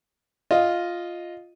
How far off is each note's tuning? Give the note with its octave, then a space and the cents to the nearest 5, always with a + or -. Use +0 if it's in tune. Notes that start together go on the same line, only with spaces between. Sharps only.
F4 +0 D#5 +0